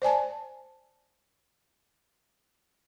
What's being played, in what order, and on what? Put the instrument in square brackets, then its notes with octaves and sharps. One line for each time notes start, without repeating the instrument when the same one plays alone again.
[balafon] C5 D5 G#5 A5